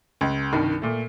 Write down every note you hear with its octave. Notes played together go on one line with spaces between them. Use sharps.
C#2
C2 G2 D#3
A#2 A3